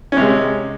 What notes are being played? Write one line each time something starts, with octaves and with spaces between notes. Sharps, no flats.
C3 G#3 C#4